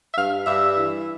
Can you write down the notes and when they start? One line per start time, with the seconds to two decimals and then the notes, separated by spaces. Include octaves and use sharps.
0.12 E5
0.16 G2 F5
0.46 G2 E5
0.75 E3